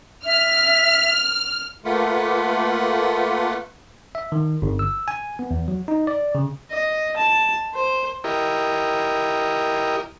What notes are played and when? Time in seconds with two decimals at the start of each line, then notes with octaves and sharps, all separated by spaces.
0.25 E5 F6
1.85 A3 A#3 F4 B4 F#5
4.15 E5
4.32 D#3
4.62 G1
4.79 E6
5.08 G#5
5.39 B3
5.51 E2
5.68 F#3
5.88 D#4
6.07 D5
6.35 C#3
6.70 D#5
7.16 A5
7.74 C5
8.24 E4 G4 A#4 D#5